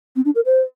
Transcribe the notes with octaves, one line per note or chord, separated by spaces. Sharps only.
C4
D4
A#4
C5